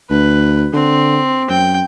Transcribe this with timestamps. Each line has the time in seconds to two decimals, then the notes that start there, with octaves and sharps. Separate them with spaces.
0.10 D2 B4
0.73 D3 C4
1.50 F#2 G5